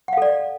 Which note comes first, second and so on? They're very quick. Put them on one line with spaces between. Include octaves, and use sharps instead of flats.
F#5 F5 A4 D5